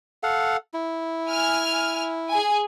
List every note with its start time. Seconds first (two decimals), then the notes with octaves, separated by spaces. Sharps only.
0.23 A4 F5 F#5
0.74 E4
1.29 G#5 F6
2.30 G#4 G#5